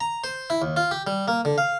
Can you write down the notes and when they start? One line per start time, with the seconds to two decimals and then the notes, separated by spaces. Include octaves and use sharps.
0.01 A#5
0.24 C5
0.50 E4
0.62 D#2
0.77 F4
0.91 G4
1.07 G3
1.28 A#3
1.45 D3
1.58 F5